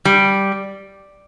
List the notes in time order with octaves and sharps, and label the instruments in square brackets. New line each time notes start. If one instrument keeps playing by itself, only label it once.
[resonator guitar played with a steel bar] G3